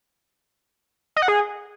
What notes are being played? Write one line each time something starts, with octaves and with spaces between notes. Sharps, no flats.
D#5
F#5
G#4